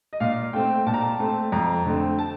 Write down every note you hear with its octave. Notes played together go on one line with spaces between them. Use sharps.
D#5
A#2 F5
A3 C4 G5
A#2 A5
A#5
A5
A3 C4
F2 A#5
D3 A3 C4
A5